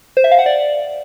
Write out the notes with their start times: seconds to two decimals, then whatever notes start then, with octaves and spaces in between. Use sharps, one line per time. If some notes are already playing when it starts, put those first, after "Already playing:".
0.17 C5
0.24 E5
0.31 F5
0.39 F#5
0.46 D5